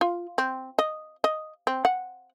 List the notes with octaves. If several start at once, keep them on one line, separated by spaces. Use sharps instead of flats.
F4
C4
D#5
D#5
C4
F#5